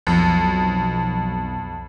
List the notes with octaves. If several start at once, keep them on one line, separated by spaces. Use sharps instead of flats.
B1 F2